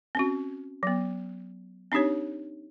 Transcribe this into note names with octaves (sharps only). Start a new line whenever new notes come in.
C4 C#4 F#4
F#3 B3
C4 D4 D#4 G4 C#5